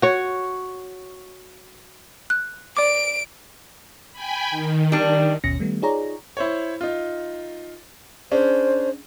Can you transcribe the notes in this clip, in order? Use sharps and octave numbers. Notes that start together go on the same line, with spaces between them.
F#4 C#5
F#6
D5 D6 D7
G5 G#5 B5
D#3
G3 D4
G#1 D#2 B2 C#4 A#6 C#7
D#3 G3 A3 B3
D#4 F4 G#4 C#5 D5 A#5
E4 C5 C#5
D#4 F4
C#4 D4 G#4 C5